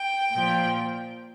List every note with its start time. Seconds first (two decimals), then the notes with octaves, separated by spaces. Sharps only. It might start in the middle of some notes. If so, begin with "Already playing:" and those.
Already playing: G5
0.32 A#2 F3